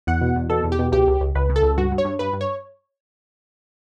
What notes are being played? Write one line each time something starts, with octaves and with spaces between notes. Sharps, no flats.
E2 F#5
B2
E2
B2 A4
E2
G4
B2
C#2 G4
C#2
C#2
C#2 B4
C#3
A4
C#2
G2 F#4
G2
C#5
G2
G2 B4
G2
C#5